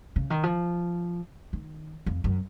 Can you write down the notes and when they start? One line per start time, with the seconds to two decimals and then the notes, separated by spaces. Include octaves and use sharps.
0.16 C#3
0.30 D#3
0.43 F3
1.53 D#3
2.06 F2
2.24 F#2